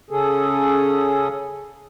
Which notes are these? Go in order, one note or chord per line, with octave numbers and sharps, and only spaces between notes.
C#3 C#4 G#4 A4